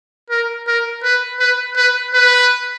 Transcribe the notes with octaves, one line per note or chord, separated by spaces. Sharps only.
A#4
A#4
B4
B4
B4
B4